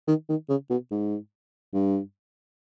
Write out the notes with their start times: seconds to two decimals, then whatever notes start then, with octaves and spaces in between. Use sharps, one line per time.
0.07 D#3
0.29 D#3
0.49 C#3
0.70 B2
0.91 G#2
1.73 G2